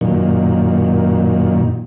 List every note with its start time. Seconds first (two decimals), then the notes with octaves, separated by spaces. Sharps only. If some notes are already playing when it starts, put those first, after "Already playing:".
0.01 F#2 A#2 D#3